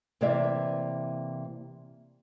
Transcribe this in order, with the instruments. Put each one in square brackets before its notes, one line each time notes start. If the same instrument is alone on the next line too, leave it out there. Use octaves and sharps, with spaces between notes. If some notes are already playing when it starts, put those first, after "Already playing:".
[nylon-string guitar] C3 E3 A#3 C#5 D5 E5